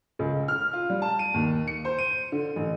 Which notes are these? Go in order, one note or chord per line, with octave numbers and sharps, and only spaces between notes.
C#2
F6
F4
G3
A5
D#7
D#2
C#7
C5
D#7
D3
A1